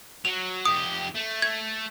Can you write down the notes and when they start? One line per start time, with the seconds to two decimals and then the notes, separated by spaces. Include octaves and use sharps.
0.25 F#3 F7
0.65 F2 G4 D#6
1.15 A3
1.42 G#6